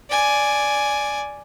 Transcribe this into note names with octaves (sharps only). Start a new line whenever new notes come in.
D5 G#5